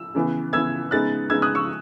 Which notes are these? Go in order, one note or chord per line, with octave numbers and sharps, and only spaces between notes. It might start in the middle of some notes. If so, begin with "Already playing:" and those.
Already playing: E6
C#3 E3 B3
C#3 E3 B3 E6 G#6
C#3 G#3 B3 D#4 F#6 A6
C#3 G#3 B3 D#4 E6 G#6
D#6 F#6
C#6 E6